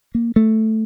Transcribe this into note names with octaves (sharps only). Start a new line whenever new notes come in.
A#3
A3